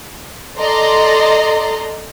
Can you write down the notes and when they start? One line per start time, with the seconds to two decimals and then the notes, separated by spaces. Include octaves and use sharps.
0.59 A4 D5 D#5 A#5 C6